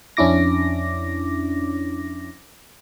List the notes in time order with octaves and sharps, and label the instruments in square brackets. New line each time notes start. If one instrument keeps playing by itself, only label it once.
[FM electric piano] F2 C#4 D4 E4 D6 A#6